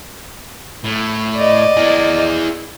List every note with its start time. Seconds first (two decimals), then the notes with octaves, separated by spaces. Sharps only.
0.84 A2
1.35 D5 D#5
1.77 E4 G#4